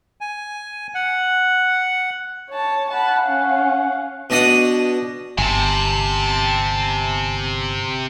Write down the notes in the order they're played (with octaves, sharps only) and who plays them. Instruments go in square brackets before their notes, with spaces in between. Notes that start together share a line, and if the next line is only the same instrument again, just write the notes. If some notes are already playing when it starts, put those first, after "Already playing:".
[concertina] G#5
F#5
[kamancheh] C#5 A5
[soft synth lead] F#5 [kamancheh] A5 B5
[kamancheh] C#4 F5
[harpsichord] B2 D4 D#5 F#5 D#6
[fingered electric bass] G1 [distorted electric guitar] C3 [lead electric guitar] G#5 A5